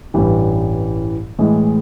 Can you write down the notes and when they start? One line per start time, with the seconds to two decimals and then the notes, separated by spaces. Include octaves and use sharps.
0.14 A1 G2 E3 G3
1.39 A2 E3 G#3